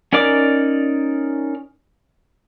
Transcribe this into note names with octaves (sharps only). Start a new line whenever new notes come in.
C#4 D#4 A#4 D5 D6